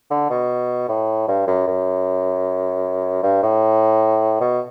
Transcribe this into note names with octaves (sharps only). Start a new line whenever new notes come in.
D3
B2
A2
G2
F#2
F#2
G2
A2
B2